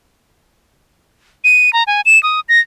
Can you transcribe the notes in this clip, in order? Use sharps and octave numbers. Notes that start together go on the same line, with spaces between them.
D#7
A#5
G#5
E7
D#6
A#6